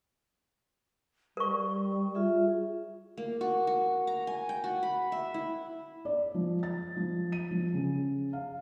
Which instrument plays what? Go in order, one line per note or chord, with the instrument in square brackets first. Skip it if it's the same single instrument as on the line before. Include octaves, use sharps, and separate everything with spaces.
[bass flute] G3 [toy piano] A#4 C#6
[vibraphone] F4 G#4 E5
[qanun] A#3
F#4
F#4
A#5
G#5
G5
F#4
B5
E5
E4
[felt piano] D5
F3
A6
F3
D#7
F3
C#3
F5